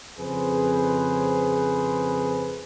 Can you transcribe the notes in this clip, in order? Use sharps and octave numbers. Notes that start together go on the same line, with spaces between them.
F2 C#3 G#4 B4 C5